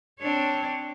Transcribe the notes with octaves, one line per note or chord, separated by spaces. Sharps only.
C4 D4 C#5